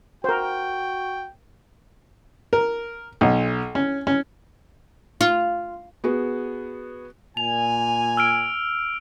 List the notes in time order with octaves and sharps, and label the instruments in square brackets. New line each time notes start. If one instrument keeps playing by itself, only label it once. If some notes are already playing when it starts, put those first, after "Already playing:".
[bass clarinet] F#4 [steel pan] A#4 C5 [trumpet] G5
[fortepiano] A#4
B1
C#4
C#4
[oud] F4
[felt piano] B3 F#4 G#4
[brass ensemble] A#2 G#5 [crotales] F7
[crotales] E6 F6 D7